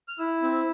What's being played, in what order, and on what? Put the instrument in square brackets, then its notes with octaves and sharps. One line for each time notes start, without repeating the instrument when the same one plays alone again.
[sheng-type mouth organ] F6
E4 E6
C4